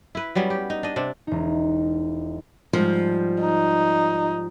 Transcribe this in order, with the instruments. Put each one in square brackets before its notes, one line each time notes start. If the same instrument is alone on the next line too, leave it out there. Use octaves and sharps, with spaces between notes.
[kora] E4 B4
F#3 G3 B3 C#4
G4
D#4
D4 D#5
C3 D4
[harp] E1 D#4
[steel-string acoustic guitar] G#2 F3 G3
[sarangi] D#4